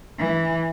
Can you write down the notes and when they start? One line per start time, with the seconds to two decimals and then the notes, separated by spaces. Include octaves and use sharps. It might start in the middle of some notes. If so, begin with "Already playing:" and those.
0.19 E3